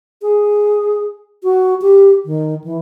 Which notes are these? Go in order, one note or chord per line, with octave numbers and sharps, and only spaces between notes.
G#4
F#4
G4
D#3
E3